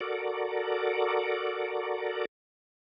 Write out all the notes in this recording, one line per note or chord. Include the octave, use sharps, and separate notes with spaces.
F#4 A4 A#4 D5